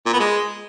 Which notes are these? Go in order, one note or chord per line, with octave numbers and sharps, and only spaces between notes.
A#2
B3
G#3